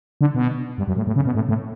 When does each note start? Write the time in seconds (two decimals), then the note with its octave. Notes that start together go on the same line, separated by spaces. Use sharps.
0.21 D3
0.35 B2
0.78 G2
0.88 F#2
0.97 A2
1.07 A2
1.16 C#3
1.26 B2
1.35 A2
1.49 A2